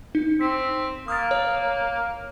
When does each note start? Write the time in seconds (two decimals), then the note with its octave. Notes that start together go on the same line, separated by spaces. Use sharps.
0.15 D#4
0.41 C4 B6
1.08 A#3 D#6 F6 A6
1.31 C#5